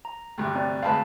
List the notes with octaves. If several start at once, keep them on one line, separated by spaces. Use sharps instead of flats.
A#5
D2 G2 C3
C4 D5 A#5
D2 G#3 B4 F5 A5